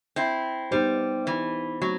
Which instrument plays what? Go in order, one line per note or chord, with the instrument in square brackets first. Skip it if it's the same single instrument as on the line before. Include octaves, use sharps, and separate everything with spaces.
[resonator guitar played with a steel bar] C4 E4
[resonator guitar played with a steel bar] G3 [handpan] B3 D#4 G4 C5
[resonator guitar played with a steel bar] E3
[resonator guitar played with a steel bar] F#3 [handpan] A3 C4 F#4